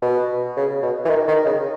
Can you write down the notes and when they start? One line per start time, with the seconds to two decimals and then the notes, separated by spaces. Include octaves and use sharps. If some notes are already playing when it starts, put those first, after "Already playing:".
0.02 B2
0.57 C#3
0.83 B2
1.05 E3
1.10 D#3
1.28 D#3
1.46 C#3